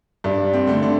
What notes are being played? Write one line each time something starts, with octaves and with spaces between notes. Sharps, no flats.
G2 D4
C4
D3 A3
D4